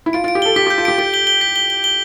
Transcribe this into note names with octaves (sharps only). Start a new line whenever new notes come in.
E4
F4 D7
F4 D7
G4
A4 G7
G4 B6
G4 G6
F4
G4 D7
G4 D7
G7
G7
B6
G7
G7
G7